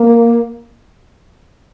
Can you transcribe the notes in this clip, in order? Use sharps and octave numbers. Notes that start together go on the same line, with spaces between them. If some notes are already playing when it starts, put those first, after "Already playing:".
Already playing: A#3